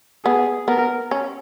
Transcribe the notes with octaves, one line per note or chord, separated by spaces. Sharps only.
B3 G#4
B3 A#4
C#4